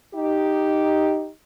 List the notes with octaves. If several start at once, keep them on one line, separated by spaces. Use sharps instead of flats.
D#4 G4